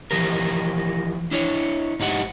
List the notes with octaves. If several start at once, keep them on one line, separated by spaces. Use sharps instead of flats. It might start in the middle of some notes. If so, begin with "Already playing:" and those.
E3 F3 G4 A#4
D4 E4 C#5
G#2 D#4 G4 F#5